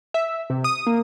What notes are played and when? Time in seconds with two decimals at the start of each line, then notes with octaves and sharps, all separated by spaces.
0.14 E5
0.50 C3
0.64 D#6
0.87 A#3